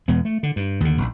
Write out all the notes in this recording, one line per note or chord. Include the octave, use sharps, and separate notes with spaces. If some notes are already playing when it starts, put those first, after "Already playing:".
E2 B2 G#3 B3
A3
D3
G2
D#2 D3
E1 A#1